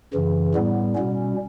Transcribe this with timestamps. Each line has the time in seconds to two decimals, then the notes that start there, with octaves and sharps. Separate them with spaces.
0.14 F#2 C#3 E3
0.54 A2 G3 B3
0.95 B2 G3 C#4